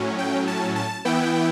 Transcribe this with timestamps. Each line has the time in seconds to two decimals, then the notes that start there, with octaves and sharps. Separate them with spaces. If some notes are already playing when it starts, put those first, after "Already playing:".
Already playing: A2 F#3 C#4
0.18 G5
0.47 A5
0.76 A5
1.05 E3 B3 E4 G5